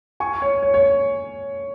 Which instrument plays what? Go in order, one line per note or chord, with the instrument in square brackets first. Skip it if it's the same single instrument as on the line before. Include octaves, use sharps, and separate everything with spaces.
[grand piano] G#5 C#6
C#5
C#5
C#5